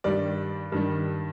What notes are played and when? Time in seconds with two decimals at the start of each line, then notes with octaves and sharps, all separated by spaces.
0.04 G2 D#3 G3 D5
0.72 G2 D#3 G3